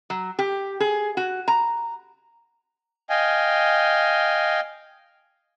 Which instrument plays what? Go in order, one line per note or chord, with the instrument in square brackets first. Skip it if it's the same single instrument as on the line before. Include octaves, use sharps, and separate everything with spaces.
[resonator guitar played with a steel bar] F#3
G4
G#4
F#4
A#5
[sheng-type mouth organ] D#5 F5 G5 G#5